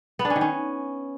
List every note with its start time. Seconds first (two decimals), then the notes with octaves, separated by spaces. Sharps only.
0.19 B3
0.25 D4
0.30 C#4
0.36 D#3
0.41 C#4